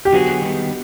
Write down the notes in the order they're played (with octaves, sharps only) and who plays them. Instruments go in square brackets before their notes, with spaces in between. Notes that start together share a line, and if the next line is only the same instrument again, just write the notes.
[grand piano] G4
[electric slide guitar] D3 F#3 B3 D#4 G#4 [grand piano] F#4
[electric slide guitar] D#3 G3 B3